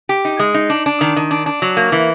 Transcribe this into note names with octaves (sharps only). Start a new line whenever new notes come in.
G4
D#4
G#3
D#4
D4
D4
D#3
D#3
D4
D4
F#3
A#3
E3